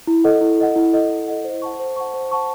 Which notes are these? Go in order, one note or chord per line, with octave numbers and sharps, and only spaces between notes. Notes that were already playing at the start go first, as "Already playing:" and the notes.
E4
A4 D#5 F#5
E4
A4 D#5 F#5
E4
A4 D#5 F#5
E4
A4 D#5 F#5
C5
F#5 A5 C#6
C5
F#5 A5 C#6
C5
F#5 A5 C#6